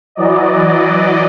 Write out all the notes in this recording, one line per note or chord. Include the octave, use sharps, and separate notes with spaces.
E3 F#3 D5 D#5